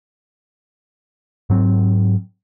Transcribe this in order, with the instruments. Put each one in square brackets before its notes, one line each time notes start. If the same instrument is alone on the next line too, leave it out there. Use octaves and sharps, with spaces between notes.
[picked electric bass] G#2 F#3 C4